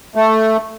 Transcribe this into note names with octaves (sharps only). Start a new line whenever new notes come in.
A3